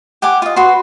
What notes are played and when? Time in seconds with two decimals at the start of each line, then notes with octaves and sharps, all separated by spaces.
0.22 G4 F#5 G#5 D6
0.42 F4 D#5
0.56 F#4 B4 C6